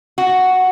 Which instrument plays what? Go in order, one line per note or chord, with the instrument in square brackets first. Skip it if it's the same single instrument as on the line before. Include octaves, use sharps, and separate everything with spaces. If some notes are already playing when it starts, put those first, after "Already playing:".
[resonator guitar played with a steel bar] F#4